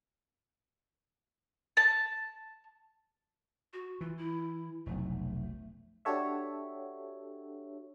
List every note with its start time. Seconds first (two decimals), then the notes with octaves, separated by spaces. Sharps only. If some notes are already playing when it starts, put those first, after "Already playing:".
1.77 A5
3.73 F#4
4.01 E3 F4
4.18 E4
4.86 F1 B1 A3
6.05 D4 F#4 G4 A4 C#5 E5